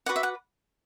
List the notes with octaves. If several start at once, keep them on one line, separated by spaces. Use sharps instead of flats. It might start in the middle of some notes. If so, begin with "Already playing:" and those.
F#4 B4 D5 F#5
E5
F#5